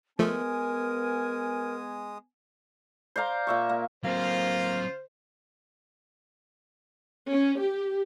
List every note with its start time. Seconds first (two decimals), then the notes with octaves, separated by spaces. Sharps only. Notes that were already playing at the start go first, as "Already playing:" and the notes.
0.19 F3 G#3 A3 B3 A#4 G#5 D#6
3.16 C5 D5 F5 A#5
3.47 A#2 E5 C#6
3.69 A#3
4.04 F#3 A#3 C4 F4 C5
7.32 C#4
7.61 G4